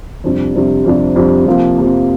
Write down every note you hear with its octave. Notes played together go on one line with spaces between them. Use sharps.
F2 C3 G3 D4
F2 C3 G3 D4
F2 C3 G3 D4
F2 C3 G3 D4
F2 C3 F3 A#3 F4
F2 C3 F3 A#3 F4